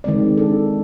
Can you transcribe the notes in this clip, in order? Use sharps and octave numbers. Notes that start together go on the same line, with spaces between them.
D#3 G#3 C4 D5
D4 A4